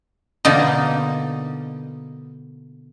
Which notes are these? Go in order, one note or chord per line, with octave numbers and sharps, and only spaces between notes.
B2 D3 A#3 D#4